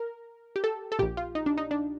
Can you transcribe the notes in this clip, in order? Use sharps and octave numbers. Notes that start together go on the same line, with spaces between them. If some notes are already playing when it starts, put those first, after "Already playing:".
Already playing: A#4
G4
A4
A4
A#1 A#2 G4
F4
D#4
D4
D#4
D4